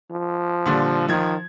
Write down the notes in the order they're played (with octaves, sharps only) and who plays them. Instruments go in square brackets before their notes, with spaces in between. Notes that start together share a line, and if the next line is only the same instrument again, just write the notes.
[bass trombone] F3
[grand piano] A#2 D3 G3
[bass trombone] D#3 [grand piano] F3 G#6